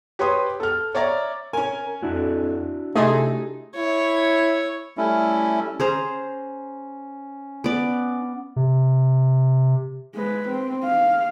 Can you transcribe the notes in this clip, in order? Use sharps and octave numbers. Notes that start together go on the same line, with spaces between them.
G4 B4 C#5 C6 D#6
A4 F6
C#5 D5 E5 A#5
C#4 A#4 G#5
F2 D4 E4 F#4
C3 A3 D#4 G#4 D#5 C6
E4 C#5
G3 A3 C#4 E4
C#4 G#4 C5 A#5
B3 D5
C3
G#3 B4
C4
F5